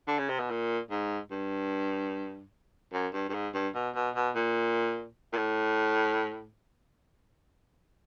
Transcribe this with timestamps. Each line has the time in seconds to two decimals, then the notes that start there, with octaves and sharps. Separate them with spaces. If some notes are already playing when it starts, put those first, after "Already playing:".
0.08 D3
0.19 C#3
0.29 C3
0.39 B2
0.50 A#2
0.91 G#2
1.31 G2
2.93 F#2
3.14 G2
3.29 G2
3.34 G#2
3.54 G2
3.75 B2
3.95 B2
4.16 B2
4.35 A#2
5.33 A#2
5.37 A2